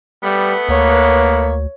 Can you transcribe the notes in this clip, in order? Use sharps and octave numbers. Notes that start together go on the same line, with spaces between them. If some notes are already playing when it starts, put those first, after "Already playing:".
G3 A3 B3
D2 A#3 C#5